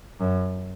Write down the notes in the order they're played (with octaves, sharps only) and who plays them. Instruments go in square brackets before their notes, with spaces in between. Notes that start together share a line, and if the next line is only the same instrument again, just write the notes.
[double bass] F#2